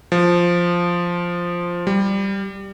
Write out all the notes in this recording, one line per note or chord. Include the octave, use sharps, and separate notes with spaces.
F3
G3